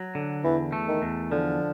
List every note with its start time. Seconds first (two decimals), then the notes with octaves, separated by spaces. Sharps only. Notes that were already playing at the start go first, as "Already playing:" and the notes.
Already playing: F#3
0.15 D3
0.44 E2 E3
0.73 A3
0.88 D#3
1.02 E2
1.31 D3 F3